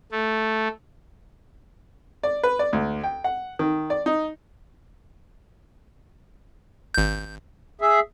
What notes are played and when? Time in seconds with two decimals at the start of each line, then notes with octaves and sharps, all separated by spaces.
0.12 A3
2.23 D5
2.43 B4
2.59 D5
2.73 D2
3.03 G5
3.24 F#5
3.59 D#3
3.90 D5
4.06 D#4
6.94 G#1 G6
7.81 G#4 E5